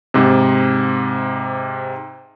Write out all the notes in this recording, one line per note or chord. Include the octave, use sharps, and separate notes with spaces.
G#2 C3